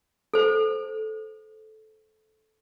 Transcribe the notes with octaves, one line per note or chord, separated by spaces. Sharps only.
A4 C5